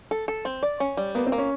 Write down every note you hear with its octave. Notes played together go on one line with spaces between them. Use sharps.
A4
A4
C4
D5
C#4
G3
A#3 B3
C4
A#3
C#4